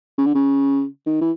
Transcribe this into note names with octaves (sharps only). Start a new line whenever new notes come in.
C#3
D3
C#3
D#3
E3